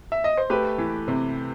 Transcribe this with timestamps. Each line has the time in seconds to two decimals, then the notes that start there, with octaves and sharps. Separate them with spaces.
0.12 E5
0.24 D#5
0.37 C5
0.50 A3 G4 B4
0.78 E3
1.08 C3